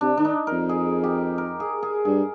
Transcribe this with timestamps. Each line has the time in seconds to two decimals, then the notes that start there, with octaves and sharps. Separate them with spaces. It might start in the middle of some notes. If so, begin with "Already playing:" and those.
0.01 C3 D4
0.17 D#3 D4
0.25 D#4
0.47 A#4
0.52 F2
0.69 G#4
1.03 G4
1.38 A#4
1.60 G#4
1.83 G#4
2.05 G2 G#4